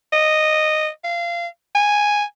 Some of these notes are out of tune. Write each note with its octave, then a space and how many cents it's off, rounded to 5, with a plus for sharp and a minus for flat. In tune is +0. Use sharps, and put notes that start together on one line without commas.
D#5 -10
F5 -20
G#5 -5